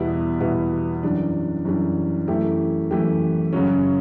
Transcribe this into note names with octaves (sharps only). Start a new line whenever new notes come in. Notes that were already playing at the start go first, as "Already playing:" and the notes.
Already playing: E2 B2 G3 B3 E4
E2 B2 G3 B3 E4
F#2 E3 G3 D4
F#2 E3 G3 D4
F#2 E3 A3 E4 G4
F#2 E3 A3 E4 G4
F#2 C#3 F#3 C#4